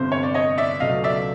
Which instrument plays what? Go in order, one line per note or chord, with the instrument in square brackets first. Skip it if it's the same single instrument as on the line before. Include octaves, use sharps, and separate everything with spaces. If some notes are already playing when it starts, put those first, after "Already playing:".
Already playing: [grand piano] G1 F2 C3 [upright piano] C5
[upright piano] C#5
D5
C#5 D#5
D5 E5
[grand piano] C#2 B2 F#3 A3 [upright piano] D#5 F5
[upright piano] D5 E5